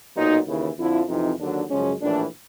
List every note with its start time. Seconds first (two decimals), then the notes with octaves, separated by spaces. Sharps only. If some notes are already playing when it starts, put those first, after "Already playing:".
0.16 B1 A#2 F#3 D#4
0.47 D#2 C#3 E3 E4
0.78 F2 D3 F3 E4
1.08 F2 C3 E3 D#4
1.39 D#2 D3 F#3 D4
1.70 F#2 C#3 F3 G#3 C#4
2.01 A#1 A2 E3 D4